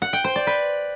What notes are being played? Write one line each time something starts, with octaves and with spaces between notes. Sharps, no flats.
F#5
G5
C5
D5
B4